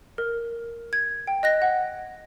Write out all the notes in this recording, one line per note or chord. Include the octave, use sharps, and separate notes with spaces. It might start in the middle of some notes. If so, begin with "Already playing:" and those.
A#4
G#6
G5
D#5 F#6 A#6
F#5